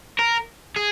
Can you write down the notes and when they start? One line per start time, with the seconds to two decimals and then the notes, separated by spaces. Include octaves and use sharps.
0.19 A#4
0.76 G#4